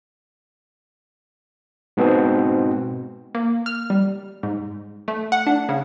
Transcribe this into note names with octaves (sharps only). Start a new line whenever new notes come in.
G#2 B2 B3 C4
A#3
F6
G3
G#2
A3
F#5
D4
C#3